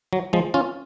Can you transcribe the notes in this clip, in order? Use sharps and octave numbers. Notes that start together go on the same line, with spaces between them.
F#3
F3 G#3
C#4 F4